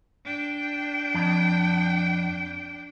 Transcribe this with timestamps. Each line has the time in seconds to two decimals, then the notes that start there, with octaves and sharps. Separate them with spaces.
0.25 D4 G5
1.15 F2